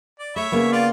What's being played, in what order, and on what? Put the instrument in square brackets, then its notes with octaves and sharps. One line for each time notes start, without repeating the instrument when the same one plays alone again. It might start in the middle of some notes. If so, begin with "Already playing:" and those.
[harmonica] D5
[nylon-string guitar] A3 [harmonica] C#5 E5 B5
[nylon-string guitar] C#3 A#3 B3
[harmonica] F4 D5